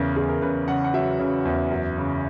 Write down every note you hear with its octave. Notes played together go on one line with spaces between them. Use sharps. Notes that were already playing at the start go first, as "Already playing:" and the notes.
Already playing: E2 C#3 A#4
E2 G#4
A#4
C#3 B4
C#3 F#5
F#5
F#3 E5
C#3
E2
F#2
C#3